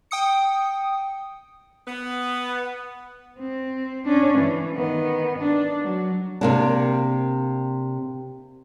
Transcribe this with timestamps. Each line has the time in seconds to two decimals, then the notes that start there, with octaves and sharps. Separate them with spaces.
0.11 G5 D#6 C#7
1.87 B3
3.39 C4
4.05 C#4 D4
4.39 E3
4.74 D#3 B3
5.38 D4
5.82 F#3
6.41 C3 A#3 D4